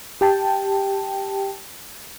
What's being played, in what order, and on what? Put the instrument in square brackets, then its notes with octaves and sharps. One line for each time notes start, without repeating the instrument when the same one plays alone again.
[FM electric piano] G4 G5 A5